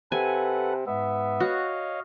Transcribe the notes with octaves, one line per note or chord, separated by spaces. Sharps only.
C3 A4 B4 F#5 G#5
G#2 B3 E5
F#4 C#5 D#5 F5